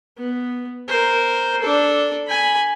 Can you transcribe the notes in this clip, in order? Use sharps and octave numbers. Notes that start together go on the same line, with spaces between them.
B3
A#4 C5
D4 A4
G#5 B5